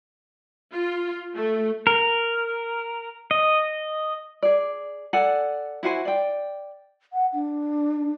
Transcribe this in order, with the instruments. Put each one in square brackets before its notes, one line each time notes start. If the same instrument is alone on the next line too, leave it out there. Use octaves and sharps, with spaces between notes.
[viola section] F4
A3
[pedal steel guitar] A#4
D#5
[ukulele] G#4 D5
A4 D5 F#5 G#5
E4 F#4 C5 G#5
D5 G5
[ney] F#5
D4